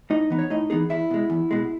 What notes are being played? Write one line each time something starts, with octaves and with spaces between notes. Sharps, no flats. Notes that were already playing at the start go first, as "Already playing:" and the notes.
A2 D#4 D#5
E3 B3 D#4
C#5
A2 D#4 D#5
E3 B3 D#4 G#4
E2 E4 E5
B2 G#3
E2
B2 G#3